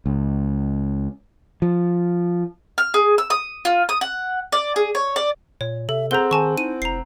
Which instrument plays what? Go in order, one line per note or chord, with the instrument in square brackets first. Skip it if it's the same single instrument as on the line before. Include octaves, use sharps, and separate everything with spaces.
[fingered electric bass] C#2
F3
[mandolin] F6
G#4
E6
D#6
F4
D#6
F#5
D5
G#4
C#5
D5
[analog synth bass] A#2 [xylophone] C#5
[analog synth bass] C3 [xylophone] A4 [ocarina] E5
[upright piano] C4 F#5 G6 [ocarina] G#4 [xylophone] A#5 G7
[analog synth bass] D#3 [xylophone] G#5 A5 C#6
[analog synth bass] D#4 [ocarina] E4 [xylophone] D#7
[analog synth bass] F1 [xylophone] A#5 C7